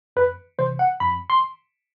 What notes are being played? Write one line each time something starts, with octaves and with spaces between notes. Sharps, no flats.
F2 B4
C3 E3 C5
F#5
F2 B5
C6